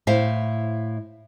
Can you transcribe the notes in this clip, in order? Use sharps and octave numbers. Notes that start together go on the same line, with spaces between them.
A2 E4 C5 E5 F5